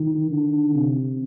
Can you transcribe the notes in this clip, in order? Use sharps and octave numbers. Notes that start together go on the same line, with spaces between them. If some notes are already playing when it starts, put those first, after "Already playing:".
Already playing: D#3
D3
C3